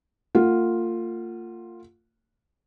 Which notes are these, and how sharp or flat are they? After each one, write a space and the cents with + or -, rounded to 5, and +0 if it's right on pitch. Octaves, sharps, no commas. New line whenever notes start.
A#3 -45 F4 +0 F#5 +0